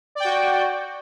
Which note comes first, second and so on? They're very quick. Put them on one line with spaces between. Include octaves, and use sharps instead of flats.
D5 G5 F#4